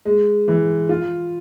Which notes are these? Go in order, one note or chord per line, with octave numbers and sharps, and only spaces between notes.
G#3
E3
F4